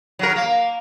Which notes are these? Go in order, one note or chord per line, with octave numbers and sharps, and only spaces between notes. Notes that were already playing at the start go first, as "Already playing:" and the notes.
F#3 A#4
A#3